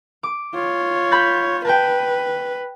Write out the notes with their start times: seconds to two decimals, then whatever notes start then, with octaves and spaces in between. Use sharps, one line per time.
0.23 D6
0.54 F4 C#5
1.11 B5 G6 A6
1.65 B4 G5 A5